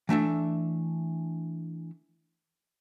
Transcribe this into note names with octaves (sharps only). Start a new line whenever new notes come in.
E3 A3 D4 E5